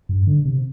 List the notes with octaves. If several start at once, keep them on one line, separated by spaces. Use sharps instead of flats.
G2
D3
C3